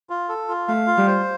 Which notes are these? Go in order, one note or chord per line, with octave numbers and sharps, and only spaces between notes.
F4
A4
F4
A3 F5
F4
G3
C5